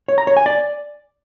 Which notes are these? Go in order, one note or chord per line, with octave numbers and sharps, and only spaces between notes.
C#5
A#5
C#5
G#5
D5